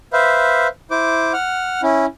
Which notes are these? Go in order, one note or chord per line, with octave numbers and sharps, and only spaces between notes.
B4 C5 E5 F5
E4 C5 D6
F#5 F6
C#4 E4